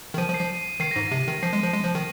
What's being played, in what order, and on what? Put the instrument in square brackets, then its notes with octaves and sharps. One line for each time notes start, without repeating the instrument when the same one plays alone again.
[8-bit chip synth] D#3
[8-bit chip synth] F3 [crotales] D#7
[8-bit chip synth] F3
[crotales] C7
[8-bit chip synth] F3
[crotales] D#7
[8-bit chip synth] D#3 [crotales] C7
[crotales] A#6
[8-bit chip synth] G#2
[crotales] C7
[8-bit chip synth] C3 [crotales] D#7
[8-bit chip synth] D#3
[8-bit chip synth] F3 [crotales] C7
[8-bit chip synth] G#3
F3
G#3
F3
D#3